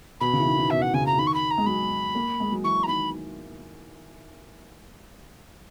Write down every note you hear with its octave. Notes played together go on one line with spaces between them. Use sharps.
B2 B5
C#3
E3
D#3
D#3
B2 E5
F#5
C#3 G#5
A#5
D#3 B5
C#6
B5
A#5
G#3
F#3 B5
A#3
G#3
F#3
E3 C#6
A#5
D#3 B5